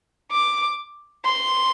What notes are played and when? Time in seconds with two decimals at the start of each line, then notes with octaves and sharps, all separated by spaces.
0.32 D6
1.25 C6